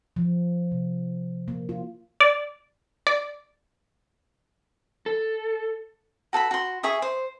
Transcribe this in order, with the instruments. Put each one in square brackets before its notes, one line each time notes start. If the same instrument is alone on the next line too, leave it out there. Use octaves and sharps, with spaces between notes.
[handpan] F3
C3
A#3
F4
[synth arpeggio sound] D5
D5
[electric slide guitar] A4
[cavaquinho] F#4 A4 G#5 B5
F#4 C6
G#4 E5 C#6 D#6
C5